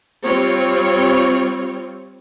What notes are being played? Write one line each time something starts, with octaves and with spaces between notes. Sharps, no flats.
G3 C4 F4 C#5